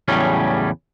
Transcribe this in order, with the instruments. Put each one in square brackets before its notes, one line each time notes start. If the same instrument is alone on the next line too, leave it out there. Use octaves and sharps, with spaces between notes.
[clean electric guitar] E2 A2 C#3 F#3 G3 C#4